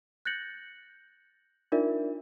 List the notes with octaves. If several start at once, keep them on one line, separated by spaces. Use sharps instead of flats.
F#6 G6 A6 A#6 C#7 F#7
D4 D#4 F4 A#4 D5 E5